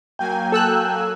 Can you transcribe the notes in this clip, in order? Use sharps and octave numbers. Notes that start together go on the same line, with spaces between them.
F#3 A#3 G5 G#5
A4 E6 F#6